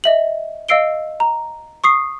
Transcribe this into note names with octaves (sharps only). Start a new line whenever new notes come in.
D#5 E5 F#7
D#5 F5 E6 C7 D7 G7
A#5
C#6 D#6 C7